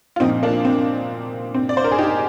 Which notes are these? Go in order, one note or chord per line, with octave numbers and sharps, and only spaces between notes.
F4
A#2 F3 C4 D#4
A#3 D4
C4
C4
D5
C5
A#4
G#4
D#4 G4